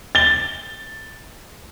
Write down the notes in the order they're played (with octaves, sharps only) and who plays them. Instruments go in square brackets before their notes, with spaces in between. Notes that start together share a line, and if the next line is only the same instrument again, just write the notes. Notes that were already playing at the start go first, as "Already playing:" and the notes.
[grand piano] A6 G7